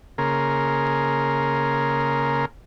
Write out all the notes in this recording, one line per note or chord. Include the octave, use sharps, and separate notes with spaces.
C#3 A#3 G#4 A#4 C6